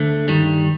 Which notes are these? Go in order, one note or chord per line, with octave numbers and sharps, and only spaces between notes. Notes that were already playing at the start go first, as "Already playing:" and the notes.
Already playing: D2 D3 A3
G2 D#3 G3